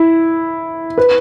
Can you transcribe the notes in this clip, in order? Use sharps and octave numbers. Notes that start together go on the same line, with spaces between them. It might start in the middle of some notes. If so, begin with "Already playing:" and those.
Already playing: E4
B4